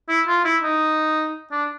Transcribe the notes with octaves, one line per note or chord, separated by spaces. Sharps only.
E4
F4
E4
D#4
D4